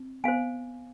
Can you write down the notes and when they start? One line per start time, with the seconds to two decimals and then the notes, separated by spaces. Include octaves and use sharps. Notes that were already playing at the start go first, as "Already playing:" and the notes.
Already playing: C4
0.24 B3 C5 F5 G#5